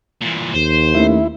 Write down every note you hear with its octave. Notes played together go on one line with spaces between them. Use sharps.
E2 A#2
D#2 C5
D#3 A3 C#4 E4